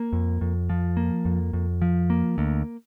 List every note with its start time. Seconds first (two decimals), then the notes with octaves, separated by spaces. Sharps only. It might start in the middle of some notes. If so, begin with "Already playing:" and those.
Already playing: A#3
0.13 F2
0.41 F2
0.70 F3
0.97 A#3
1.25 F2
1.53 F2
1.82 F3
2.10 A#3
2.38 D2